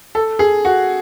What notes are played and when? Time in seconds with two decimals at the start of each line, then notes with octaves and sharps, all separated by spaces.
0.15 A4
0.39 G#4
0.65 F#4